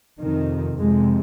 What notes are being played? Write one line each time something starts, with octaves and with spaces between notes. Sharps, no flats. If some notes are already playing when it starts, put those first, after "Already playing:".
F2 C3 D#3
F2 C3 G#3